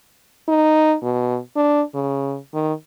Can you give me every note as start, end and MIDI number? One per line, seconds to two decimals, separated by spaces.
0.48 0.95 63
1.02 1.39 47
1.56 1.82 62
1.95 2.37 49
2.54 2.73 51